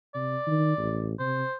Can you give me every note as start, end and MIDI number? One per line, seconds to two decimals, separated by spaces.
0.15 0.37 48
0.15 1.11 74
0.47 0.73 51
0.78 1.16 33
1.19 1.43 48
1.19 1.55 72